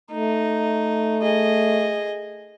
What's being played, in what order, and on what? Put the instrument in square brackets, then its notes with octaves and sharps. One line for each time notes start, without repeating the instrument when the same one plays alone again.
[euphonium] A3 [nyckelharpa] D#4
[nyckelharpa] G#4 D#5